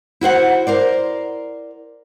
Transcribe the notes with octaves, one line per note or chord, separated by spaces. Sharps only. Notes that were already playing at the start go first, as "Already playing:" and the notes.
E4 F#4 C5 F#5
A#4 C5 D5